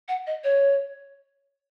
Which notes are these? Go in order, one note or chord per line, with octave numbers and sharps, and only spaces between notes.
F#5
D#5
C#5